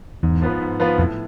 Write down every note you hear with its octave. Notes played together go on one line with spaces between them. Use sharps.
E2 G#2
F3 B3 F4 B4
G#2
F3 B3 F4 B4
F2 A2